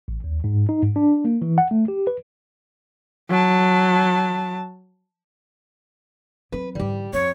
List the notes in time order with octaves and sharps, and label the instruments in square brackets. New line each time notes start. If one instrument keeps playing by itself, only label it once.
[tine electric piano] A1
D#2
G#2
D#4
G#2
D4
A#3
E3
F#5
A3
G4
B4
[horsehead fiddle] F#3 A5
[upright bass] F#3 C4 [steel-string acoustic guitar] B4
[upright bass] G#2 D3 [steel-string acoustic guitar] G3 G4
[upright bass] F2 [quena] C#5